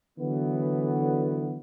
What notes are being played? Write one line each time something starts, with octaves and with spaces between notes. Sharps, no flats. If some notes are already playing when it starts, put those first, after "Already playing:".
D3 E3 F#3 B3